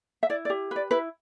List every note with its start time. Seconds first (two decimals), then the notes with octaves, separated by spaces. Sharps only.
0.23 E5
0.30 E4 D5
0.45 D5
0.50 G4
0.71 B4 D5
0.91 E4 B4